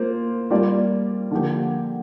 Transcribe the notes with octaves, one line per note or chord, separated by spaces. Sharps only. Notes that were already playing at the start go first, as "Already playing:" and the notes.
Already playing: A#3 F4 C5
G3 A#3 F4 D5
D3 F3 A#3 G4